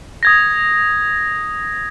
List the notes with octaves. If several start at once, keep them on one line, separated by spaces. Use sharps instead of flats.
D#6 G#6 A#6